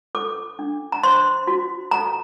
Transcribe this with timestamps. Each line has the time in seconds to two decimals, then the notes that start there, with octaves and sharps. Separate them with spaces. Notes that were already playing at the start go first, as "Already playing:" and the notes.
0.15 A4 D6
0.59 D4
0.92 A#5
1.03 C5 C6
1.47 F#4
1.91 A4 A#5